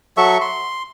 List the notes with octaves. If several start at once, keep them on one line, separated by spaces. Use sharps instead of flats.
F#3 A4 E5 C#6
C6